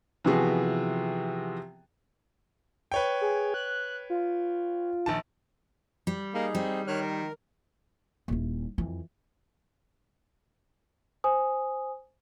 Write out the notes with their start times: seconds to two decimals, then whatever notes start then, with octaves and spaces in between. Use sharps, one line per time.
0.24 C3 E3 F3 B3 F#4 G#4
2.92 B4 C#5 G5
3.21 G#4
3.54 F#6
4.10 F4
5.06 A#1 D#3 A5
6.07 G3
6.34 A#3 D#4 G#4
6.55 G3 C4
6.87 D#3 C#5 F6 F#6
7.02 A#4
8.28 D#1 E4
8.78 F2 E3
11.24 C5 G#5 D#6